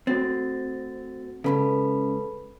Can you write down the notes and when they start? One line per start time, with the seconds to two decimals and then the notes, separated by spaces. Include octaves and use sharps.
0.07 A3 C4 F#4 A6
1.44 C#2 F#2 C#3 A4 B4 B5